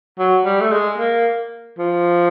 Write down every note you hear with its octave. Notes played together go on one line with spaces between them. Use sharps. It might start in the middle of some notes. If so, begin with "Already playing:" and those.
F#3
G3
A3
G#3
A#3
F3